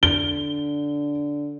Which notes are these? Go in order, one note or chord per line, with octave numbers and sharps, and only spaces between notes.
D3 G7